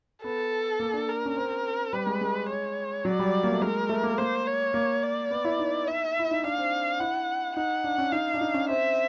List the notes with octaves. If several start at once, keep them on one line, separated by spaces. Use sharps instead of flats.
B3 A4
A#3
D4
A#4
C#4
C4
G3 B4
G#3
G#3
C#5
F#3 D5
G3
A#3
A3
G#3 A#4
A3
A#3
A#3 C5
C#5
A#3
D5
B3
E4
D#4
E5
E4
D#4
D4 F5
C4
E4 F#5
D#4 F#5
D4
C#4
D#4 F5
D4
D#4
C#4
C4 E5